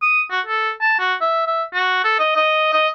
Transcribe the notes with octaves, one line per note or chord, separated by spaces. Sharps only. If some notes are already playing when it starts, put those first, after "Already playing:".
D#6
F#4
A4
A5
F#4
E5
E5
F#4
A4
D#5
D#5
D#5